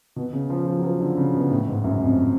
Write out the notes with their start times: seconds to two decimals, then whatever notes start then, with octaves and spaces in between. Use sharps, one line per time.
0.16 B2
0.33 C#3
0.50 F3
0.66 F3
0.78 F#3
0.84 F3
1.00 D3
1.17 C#3
1.34 B2
1.50 A2
1.67 G#2
1.84 F#2
2.01 F2